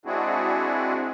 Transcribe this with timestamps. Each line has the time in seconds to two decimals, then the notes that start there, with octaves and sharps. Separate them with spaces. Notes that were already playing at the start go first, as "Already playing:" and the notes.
0.06 G#3 C4 D4 E4 F#4 G#4